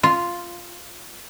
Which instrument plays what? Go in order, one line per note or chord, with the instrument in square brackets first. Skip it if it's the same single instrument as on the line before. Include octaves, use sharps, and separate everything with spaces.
[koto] F4